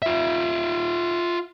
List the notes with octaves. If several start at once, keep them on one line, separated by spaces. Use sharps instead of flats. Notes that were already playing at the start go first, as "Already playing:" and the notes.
F4 E5